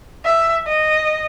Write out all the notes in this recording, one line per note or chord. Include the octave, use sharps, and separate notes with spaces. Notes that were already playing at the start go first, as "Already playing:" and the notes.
E5
D#5